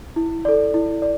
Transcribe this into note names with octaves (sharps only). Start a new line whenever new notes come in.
E4
A4 D5
E4
D5